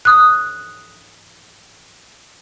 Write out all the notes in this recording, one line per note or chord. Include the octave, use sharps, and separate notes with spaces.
D#6 F#6